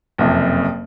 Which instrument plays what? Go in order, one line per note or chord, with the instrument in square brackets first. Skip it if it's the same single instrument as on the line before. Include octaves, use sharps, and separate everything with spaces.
[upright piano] F#1 F2 C3